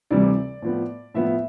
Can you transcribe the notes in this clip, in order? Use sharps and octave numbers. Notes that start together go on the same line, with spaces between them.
D2 C3 E3 G3 D5
A2 F3 B3
A2 F3 B3 E5